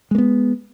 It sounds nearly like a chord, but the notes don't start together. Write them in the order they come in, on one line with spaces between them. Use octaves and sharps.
G#3 A#3 B3